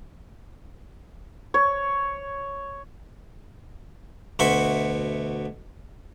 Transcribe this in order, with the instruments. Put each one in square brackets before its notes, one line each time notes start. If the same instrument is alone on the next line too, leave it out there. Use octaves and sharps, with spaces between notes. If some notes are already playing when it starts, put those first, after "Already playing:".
[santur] C#5
[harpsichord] D2 B2 F#4 E5 C6 C#6